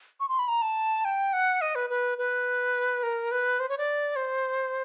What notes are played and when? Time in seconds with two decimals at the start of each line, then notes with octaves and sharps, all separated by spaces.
0.20 C#6
0.29 C6
0.39 B5
0.48 A#5
0.62 A5
1.05 G5
1.33 F#5
1.61 D#5
1.75 B4
1.90 B4
2.18 B4
3.03 A#4
3.31 B4
3.60 C5
3.69 C#5
3.78 D5
4.16 C5